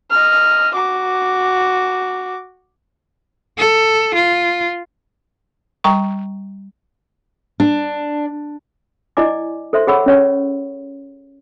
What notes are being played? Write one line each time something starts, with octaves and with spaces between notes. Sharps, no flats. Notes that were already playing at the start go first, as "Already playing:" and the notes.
D#5 F6
F#4 D6
A4
F4
G3 G5 A#5 C#6
D4
E4 D5 D#5 G#5 D6
A4 C5 E5 C6
G#4 C#5 F#5 B5 C#6 E6
C#4 C#5 C#6